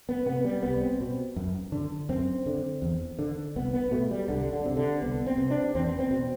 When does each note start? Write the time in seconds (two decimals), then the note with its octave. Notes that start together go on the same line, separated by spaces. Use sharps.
0.09 B3
0.26 C3 B3
0.44 G3
0.63 C2 B3
0.81 C4
1.00 B2
1.36 F#2
1.72 D3
2.09 F#2 C4
2.46 D3
2.82 E2
3.19 D3
3.56 C2 B3
3.74 B3
3.91 B2 A3
4.11 G3
4.28 C2 D3
4.52 D3
4.66 C3
4.77 D3
5.02 C2 B3
5.26 C4
5.38 C3
5.50 D4
5.75 E2 C4
5.87 B3
5.99 C4
6.11 B2